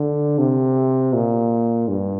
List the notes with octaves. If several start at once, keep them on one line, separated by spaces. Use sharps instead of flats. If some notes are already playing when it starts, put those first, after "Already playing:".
Already playing: D3
C3
A#2
G2